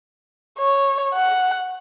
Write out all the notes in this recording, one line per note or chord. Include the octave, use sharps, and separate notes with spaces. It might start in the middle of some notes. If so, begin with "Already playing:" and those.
C#5
F#5